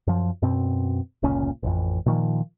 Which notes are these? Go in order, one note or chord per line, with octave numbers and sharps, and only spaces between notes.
F#2 F3
F#2 B2 C4
F1 C#2 A#2 C#4
A1 F2
A#2 D#3 F3